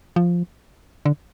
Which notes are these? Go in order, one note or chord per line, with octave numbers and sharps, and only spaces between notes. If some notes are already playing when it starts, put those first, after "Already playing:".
F3
D3